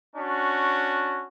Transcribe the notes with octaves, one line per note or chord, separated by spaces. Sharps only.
C#4 D4 F#4